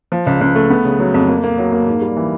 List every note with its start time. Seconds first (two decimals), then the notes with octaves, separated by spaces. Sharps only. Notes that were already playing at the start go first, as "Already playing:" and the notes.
0.12 F3
0.27 C#2
0.41 C#2
0.55 A3
0.70 B3
0.85 C#3
0.99 F#3
1.14 F2
1.29 A#3
1.44 A#3
1.58 F#3
1.73 A#3
1.87 G#2
2.02 G3
2.16 E3